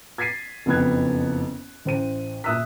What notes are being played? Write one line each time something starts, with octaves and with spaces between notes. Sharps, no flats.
G#6 A6 B6 C7 D#7
F#1 F2 B3 F#6 G#6
A1 C5 D#7
A#2 E5 D#6 E6 F#6 B6